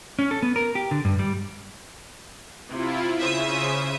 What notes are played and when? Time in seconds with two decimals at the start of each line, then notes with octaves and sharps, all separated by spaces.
0.19 C#4
0.31 A4
0.43 B3
0.56 A#4
0.75 G4
0.91 D3
1.05 G2
1.19 G3
2.69 C3 E4 F4
3.19 C#3 C5 E5 D#6